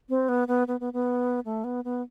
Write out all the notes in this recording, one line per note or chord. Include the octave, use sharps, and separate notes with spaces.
C4
B3
B3
B3
B3
B3
A3
B3
B3